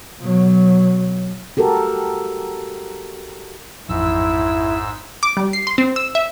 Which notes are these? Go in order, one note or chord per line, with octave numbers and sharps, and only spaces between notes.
B2 F#3
F#4 G4 A4 A#4
A1 F2 G#2 E4 E6
D6
G3
C7
C6
C4
E6
E5